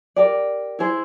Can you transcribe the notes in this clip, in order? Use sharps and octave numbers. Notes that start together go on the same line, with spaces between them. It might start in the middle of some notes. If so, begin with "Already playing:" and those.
G4 A#4 D5
E4 G#4 C5